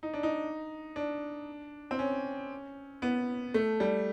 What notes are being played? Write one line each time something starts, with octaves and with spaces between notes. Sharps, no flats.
D#4
D4
D#4
D4
C4
C#4
B3
A3
G3